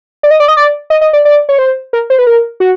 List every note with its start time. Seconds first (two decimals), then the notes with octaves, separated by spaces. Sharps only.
0.23 D5
0.31 D#5
0.40 D5
0.48 D#5
0.57 D5
0.90 D#5
1.01 D#5
1.13 D5
1.25 D5
1.49 C#5
1.59 C5
1.93 A#4
2.10 C5
2.19 B4
2.27 A#4
2.60 F#4